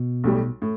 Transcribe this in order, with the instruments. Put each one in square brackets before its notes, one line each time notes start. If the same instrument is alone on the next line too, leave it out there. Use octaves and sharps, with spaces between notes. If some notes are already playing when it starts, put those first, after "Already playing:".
Already playing: [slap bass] B2
[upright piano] B1 A2 G3
A2